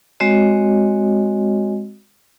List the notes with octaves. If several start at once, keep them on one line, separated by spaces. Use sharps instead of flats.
G#3 C4 F#4 C#5 D#5